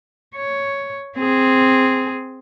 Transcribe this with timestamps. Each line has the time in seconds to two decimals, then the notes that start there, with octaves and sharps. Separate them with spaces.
0.35 C#5
1.17 C4 G#4